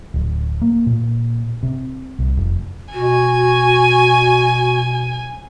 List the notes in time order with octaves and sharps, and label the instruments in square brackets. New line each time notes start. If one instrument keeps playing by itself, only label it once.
[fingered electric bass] D1
A#3
A#2
C3
C2
F1
[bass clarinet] B2 [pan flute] F#4 [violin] G#5